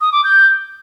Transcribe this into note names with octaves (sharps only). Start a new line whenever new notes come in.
D#6
D6
G6